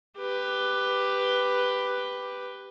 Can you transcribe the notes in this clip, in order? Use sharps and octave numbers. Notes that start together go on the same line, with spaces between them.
G4 B4